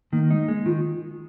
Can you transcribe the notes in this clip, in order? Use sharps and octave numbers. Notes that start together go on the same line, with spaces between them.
D#3 A#3
G#3 D#4
G#3 A#3
D#3 F4